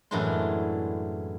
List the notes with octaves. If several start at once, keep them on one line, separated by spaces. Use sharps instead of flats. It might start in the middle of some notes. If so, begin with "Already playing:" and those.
F#2 A2 E3 G#3 D4 C6